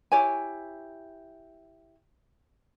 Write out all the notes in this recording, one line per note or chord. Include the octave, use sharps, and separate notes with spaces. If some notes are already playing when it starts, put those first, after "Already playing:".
E4 G4 C#5 G#5